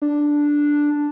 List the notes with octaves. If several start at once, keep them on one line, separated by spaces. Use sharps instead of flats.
D4